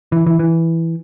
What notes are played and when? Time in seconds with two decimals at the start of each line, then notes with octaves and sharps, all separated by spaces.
0.12 E3
0.27 E3
0.39 E3